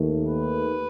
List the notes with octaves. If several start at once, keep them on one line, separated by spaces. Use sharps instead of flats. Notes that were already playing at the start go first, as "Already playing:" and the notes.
Already playing: D#2 D#3 A3
B4